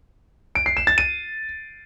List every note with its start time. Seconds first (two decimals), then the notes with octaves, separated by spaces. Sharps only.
0.55 D7
0.66 C7
0.77 E7
0.87 A6
0.98 D#7